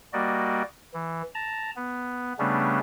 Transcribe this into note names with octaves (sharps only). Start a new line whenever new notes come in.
G3 A#3 F#4 D5 D#5
E3
A5 A#5
B3
C#3 G3 A3 B3 C#4 D4